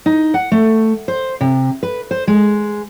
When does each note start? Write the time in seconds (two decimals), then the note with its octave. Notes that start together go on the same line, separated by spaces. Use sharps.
0.06 D#4
0.34 F#5
0.52 A3
1.08 C5
1.41 C3
1.83 B4
2.11 C5
2.27 G#3